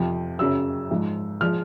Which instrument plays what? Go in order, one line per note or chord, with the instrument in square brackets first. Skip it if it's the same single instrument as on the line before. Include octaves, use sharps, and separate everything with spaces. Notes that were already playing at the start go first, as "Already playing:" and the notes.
Already playing: [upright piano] F2 C3 F3
F#2 C#3 F#3 E6
G#2 F3 G#3
F3 G#3 F6